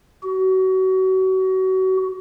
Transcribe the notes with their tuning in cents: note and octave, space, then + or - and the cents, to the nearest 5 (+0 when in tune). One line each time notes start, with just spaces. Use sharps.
F#4 +30